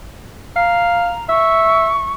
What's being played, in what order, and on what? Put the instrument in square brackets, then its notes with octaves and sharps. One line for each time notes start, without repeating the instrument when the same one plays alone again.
[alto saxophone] F5 [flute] A#5
[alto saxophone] E5 [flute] C#6